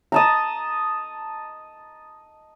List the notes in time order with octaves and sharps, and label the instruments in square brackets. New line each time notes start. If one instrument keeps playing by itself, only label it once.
[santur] D#5 A5 A#5